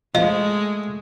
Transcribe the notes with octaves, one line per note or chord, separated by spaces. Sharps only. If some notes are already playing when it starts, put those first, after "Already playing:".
F3 G#3 A3 D#5